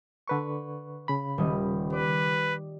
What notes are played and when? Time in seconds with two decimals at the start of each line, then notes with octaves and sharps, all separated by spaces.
0.28 D3 B4 C#6
1.08 C#3 B5
1.38 D#1 G3 D#5
1.93 B4 D5